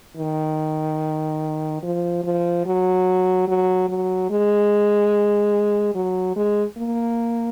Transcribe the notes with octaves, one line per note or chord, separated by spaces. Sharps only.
D#3
F3
F3
F#3
F#3
F#3
G#3
F#3
G#3
A#3